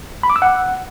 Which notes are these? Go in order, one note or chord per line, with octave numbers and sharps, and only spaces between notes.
B5
D6
E6
F#5